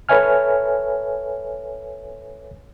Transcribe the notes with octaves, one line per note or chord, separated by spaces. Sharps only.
A4 B4 C#5 E5 G#5 F6